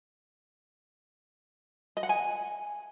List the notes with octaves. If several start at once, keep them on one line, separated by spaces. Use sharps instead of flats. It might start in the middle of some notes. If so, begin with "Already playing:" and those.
D#5
F#5
G#5